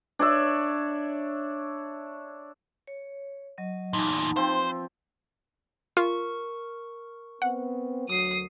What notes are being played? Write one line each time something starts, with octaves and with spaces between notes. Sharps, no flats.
D4 C#5 E5
C#5
F#3 D#5
E2 A#2 D#4 A5 B5
F3 C4 C5
F4 A#4 C#6
B3 C4 F#5
D2 F#3 D#6 C7